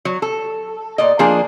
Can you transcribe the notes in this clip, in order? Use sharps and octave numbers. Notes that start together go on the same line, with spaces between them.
F#3
A4
A#2 D5 D#5
F3 A#3 D4 G#4